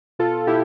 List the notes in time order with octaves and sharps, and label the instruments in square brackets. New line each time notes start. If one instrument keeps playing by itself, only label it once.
[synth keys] B2 F4 A4
B2 E4 G4